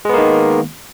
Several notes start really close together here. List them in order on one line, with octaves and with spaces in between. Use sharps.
G#3 B3 A#3 D#3